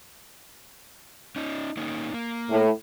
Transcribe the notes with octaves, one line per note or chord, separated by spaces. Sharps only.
C#4 D#4
A#3 C#4 D#4
A#3
A2